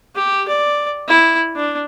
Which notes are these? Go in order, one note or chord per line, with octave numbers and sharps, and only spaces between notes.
G4
D5
E4
D4